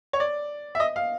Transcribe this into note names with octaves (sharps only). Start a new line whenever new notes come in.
C#5
D5
E5
D#5
F5